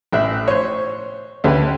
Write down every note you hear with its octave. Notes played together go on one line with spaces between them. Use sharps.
A1 E5 F#6
C5 C#5
D2 C#4 G4 B4